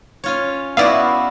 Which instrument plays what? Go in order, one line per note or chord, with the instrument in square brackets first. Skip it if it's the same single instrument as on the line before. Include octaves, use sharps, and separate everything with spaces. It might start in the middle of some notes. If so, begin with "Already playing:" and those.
[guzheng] C#4 F4 C#5
[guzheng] B3 E4 F#4 [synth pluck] D5 E5 F5